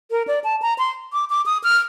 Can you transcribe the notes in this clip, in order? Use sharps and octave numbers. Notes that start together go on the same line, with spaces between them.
A#4
D5
A5
A#5
C6
D6
D6
D#6
F6